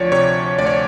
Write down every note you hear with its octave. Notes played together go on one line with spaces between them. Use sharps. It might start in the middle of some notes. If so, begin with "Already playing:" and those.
Already playing: D2 F3 C#5 D5
C3 C#5
D2 D5
C#5